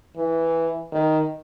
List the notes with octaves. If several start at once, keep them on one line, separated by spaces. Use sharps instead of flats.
E3
D#3